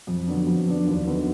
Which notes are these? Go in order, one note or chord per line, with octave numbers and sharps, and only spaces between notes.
F2
D3 F#3 B3 D4
F2
D3 F#3 B3 D4
D#2
D3 F#3 B3 D#4